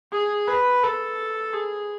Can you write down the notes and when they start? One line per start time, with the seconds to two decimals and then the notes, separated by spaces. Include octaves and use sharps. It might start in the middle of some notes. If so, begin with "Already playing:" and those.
0.12 G#4
0.47 B4
0.83 A4
1.53 G#4